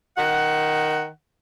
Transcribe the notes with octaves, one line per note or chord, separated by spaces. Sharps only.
D#3 F#5